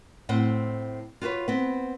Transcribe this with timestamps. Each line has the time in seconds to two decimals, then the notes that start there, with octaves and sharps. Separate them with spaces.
0.29 A2 C4 C5 F#5
1.21 F4 F#4 A4 B4 C#5
1.48 B3 C4